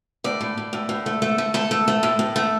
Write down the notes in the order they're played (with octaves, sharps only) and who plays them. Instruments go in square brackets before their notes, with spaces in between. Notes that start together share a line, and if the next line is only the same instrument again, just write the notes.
[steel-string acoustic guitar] A2 D5
A2
A2
A2
A2
A3
A3
A3
A3 A4
A3
A3
A2
A2
A3